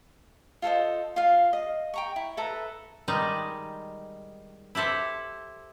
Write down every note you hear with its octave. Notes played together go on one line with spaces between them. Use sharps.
F4 A4 C5 D#5
F4 F5
D#5
G5 A#5 C#6
E4
A4 B4 E5 A#5
D#3 G3 G#3 D#4
E4 G4 A4 C5